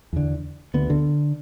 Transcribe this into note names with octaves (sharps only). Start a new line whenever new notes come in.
E2 D3
D2 D3 B3
D3